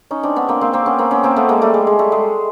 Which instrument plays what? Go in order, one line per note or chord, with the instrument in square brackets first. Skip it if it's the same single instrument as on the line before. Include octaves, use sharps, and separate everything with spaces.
[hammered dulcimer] C#4 D#4
C4 D4
B3 C#4
A#3 C4
A#3 C4
A#3 C4
B3 C#4
A#3 C4
B3 C#4
A#3 C4
A3 B3
G#3 A#3
G3 A3
G#3
G#3
G3 A3
G#3